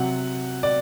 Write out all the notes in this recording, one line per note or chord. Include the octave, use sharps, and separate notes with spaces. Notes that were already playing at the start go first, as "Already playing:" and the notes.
Already playing: C3 F#3 F#5
D5